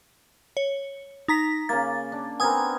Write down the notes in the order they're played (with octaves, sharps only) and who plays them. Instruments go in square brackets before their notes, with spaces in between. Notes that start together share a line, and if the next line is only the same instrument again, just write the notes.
[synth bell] C#5
D#4 A#5 B6
[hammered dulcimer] C#3 A#3 [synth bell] A6
[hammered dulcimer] D4
[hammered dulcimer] B3 C4 A#4 [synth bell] G#5 D#6 G#6